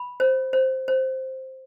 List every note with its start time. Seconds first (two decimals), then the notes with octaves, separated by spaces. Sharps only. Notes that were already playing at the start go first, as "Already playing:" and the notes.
Already playing: B5
0.20 C5
0.53 C5
0.88 C5